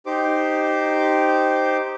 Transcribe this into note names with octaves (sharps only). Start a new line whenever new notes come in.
D#4 G4 C5 D6